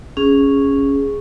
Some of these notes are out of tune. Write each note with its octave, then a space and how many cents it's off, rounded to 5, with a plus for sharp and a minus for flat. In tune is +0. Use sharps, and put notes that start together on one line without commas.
C#4 +0 G#4 -5